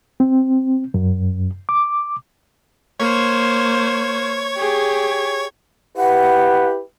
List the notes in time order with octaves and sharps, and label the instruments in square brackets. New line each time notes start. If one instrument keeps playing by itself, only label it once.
[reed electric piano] C4
F#2
D6
[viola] A#3 C5 [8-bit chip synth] C#5 C#6 G#6
[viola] G4 G#4
[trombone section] E4 G4 B4 [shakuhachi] F#5